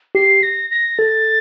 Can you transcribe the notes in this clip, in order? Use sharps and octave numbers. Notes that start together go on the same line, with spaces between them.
G4 C7
A#6
A#6
A4 A6